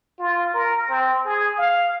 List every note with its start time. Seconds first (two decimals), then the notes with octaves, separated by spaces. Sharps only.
0.19 F4
0.54 A#4
0.89 C4
1.26 G#4
1.58 F5